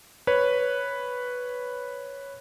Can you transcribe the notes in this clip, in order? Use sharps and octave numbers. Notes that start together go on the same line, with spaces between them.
B4 C#5